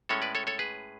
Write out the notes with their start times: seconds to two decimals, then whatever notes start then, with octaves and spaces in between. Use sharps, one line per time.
0.09 A2 G#3 C#4 A4 C#5
0.22 B4 D5
0.35 A4 C#5
0.47 A4 C#5
0.59 G#4 B4